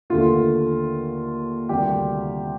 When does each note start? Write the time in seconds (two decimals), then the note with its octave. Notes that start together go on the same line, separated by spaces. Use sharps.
0.10 D#2 D3 A3 F4
1.69 D2 C3 D#3 G3 G4